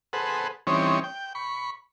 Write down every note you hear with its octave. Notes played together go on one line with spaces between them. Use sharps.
G#4 A4 B4 C5 F#5
E3 G3 C4 C#4 D#4 C#5
G5
B5 C#6